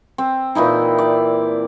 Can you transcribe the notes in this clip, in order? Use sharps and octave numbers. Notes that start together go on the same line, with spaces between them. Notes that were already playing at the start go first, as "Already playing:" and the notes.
C4
A#2 E3 D#4 E4
D5